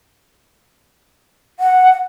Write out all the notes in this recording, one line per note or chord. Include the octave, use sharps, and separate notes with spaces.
F#5